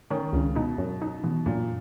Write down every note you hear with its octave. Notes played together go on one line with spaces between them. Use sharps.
D#3 C#4
C#2 C#3
B2 D#4
F#2
D#4
B2 E3
F#2 A#2